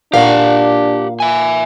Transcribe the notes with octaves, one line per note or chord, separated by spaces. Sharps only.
A#2 D4 G4 F5 F#5
E5 G#5